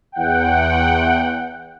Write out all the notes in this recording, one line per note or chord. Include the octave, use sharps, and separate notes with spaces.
E2 F#5 G5